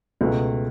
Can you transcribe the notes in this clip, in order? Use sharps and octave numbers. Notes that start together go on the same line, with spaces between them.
C#2 B2 A3